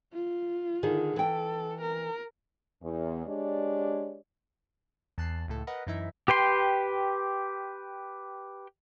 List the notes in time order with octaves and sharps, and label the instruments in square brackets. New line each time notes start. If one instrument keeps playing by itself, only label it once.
[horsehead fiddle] F4
[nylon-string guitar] D3 D#3 G#4
[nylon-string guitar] E3 G5 [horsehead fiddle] A4
[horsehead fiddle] A#4
[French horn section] E2
G#3 D4 G4 C#5 D5
[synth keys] E2 A5 F#6 C7
C#2 A2 A4
A#4 B4 D#5 F#5
F#2 E3 D#4 E4 E5
[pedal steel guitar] G4 B4 G5 C6